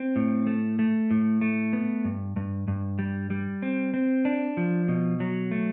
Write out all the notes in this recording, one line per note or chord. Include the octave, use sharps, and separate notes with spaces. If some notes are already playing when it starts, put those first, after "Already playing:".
Already playing: C4
A2
A3
A3
A2
A3
B3
G2
G2
G2
G3
G3
C4
C4
D4
F3
B2
F#3
A3